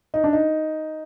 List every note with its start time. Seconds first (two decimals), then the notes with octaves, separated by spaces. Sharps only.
0.14 D#4
0.24 D4
0.33 D#4